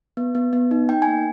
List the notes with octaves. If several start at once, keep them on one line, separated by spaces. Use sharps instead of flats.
B3
B3
B3
D#4
D#4 G5
G#5
A#3